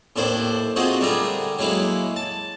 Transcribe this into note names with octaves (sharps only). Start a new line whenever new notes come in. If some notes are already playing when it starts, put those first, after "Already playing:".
D#2 A2 D4 E4 C5
C4 D#4 F4 F#4 G#4 D#5
D3 G3 A3 G#4 A#4
F#3 G#3 A#3 E4 F5
A5